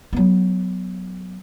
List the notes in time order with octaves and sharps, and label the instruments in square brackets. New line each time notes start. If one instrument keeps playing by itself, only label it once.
[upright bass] F#3 B3